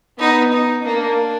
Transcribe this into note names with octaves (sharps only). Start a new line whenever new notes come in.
B3 D#4
D#4
A#3 D4